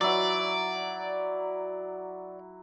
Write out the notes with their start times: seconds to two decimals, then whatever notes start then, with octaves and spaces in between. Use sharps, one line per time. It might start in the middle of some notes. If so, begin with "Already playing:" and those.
0.01 F#3 E4 D5